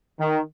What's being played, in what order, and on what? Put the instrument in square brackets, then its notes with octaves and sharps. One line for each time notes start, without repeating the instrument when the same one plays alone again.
[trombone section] D#3